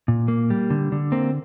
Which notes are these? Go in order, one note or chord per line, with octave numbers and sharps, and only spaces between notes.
A#2
A#3
G3
D3
D3
A#3 C4